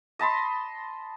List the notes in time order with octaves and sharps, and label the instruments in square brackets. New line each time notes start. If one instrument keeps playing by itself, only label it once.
[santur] D#5 A5 B5 C6